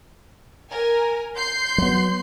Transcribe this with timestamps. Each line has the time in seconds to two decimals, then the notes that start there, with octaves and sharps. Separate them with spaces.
0.72 A#4 G#5
1.36 C6 G6 C7
1.78 F#3 B3